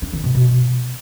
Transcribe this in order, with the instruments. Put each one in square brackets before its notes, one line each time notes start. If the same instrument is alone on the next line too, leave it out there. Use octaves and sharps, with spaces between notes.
[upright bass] D4
D#3
B2
B2